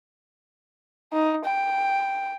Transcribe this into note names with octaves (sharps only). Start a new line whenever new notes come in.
D#4
G5